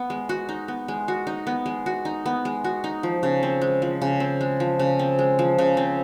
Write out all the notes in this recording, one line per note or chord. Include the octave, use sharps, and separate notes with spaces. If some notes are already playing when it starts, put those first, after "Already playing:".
Already playing: B3
G#3
F#4
D#4
B3
G#3
F#4
D#4
B3
G#3
F#4
D#4
B3
G#3
F#4
D#4
F3
C#3
C4
G#3
F3
C#3
C4
G#3
F3
C#3
C4
G#3
F3
C#3
C4